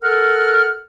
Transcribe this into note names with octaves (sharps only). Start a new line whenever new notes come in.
A4 A#4 F#5 F6